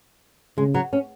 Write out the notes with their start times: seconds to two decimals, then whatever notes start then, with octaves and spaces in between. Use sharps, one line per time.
0.57 C#3 G#3
0.74 F#3
0.93 C#4